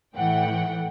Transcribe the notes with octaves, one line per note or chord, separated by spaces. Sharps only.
A2 E3 F#5 G5